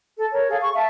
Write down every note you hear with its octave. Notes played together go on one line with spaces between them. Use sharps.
A4
A#4 C#5
G#4 A4 F5
C#6
E5 F5 A5